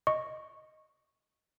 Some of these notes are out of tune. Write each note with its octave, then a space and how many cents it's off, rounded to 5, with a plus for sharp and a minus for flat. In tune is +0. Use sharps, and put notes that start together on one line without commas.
D#5 +0 C#6 -10